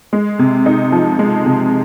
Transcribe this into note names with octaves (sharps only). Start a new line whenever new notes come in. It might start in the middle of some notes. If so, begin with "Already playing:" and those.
G#3
C3
D#4
F3
G#3
C3